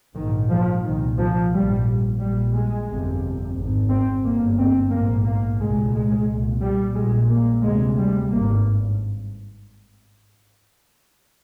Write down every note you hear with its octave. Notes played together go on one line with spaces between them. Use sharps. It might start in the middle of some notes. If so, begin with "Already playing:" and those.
A#1 G#2 D#3
F3
C2 A#2 D#3
F3
A#1 G#2 G3
A#1 A#2 G3
G#3
G1 F2 C3
G#1 G#2
C4
G1 G2 A#3
C4
A#1 G#2 A#3
A#3
C2 A#2 G#3
G#3
C2 A#2
G3
A#1 A#2 G#3
A#3
D2 C3 G#3
G3
G#1 G2 A#3